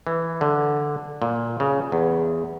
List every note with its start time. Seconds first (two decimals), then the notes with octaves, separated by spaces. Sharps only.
0.07 E3
0.41 D3
1.22 A#2
1.60 C#3
1.92 E2